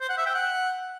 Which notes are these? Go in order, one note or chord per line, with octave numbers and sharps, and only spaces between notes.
C5
F#5
E5
G5
F#5